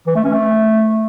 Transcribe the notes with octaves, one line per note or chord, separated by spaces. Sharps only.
E3
A3
C#4
A3